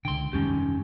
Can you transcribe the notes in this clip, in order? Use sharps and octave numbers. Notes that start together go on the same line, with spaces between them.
C#2 D3 G5 C6
F1 G2 D#3 G#3 C#4 G4